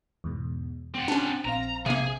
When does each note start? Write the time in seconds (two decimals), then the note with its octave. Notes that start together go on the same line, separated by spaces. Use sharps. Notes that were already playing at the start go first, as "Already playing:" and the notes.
0.24 E2 G#2 B2
0.95 C4 F#5 G5 C6 A6
1.08 C#4 D4
1.45 A#1 C4 F5 A#5
1.86 C3 A#3 G#4